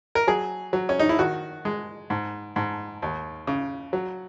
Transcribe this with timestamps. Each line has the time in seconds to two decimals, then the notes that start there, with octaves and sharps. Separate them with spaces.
0.15 A#4
0.27 F#3 G#4
0.73 F#3
0.89 C#4
0.99 D#4
1.09 E4
1.19 D#3 F#4
1.65 G#3
2.10 G#2
2.56 G#2
3.02 D#2
3.47 C#3
3.93 F#3